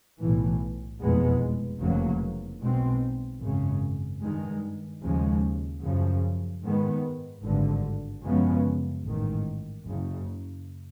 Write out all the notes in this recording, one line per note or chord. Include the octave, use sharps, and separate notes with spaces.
B1 A2 E3
F1 E2 B2 G#3 B3
F1 E2 C#3 F#3 A#3
B1 B2 G#3 C4
G#1 F#2 C#3
G2 D#3 G#3
D#2 C#3 F3 G#3
F#2 C#3 F3
G#2 D#3 G#3 B3
G#1 G2 D3
F#2 C#3 F3 G#3 B3
A1 G#2 D#3
F#1 F#2 C#3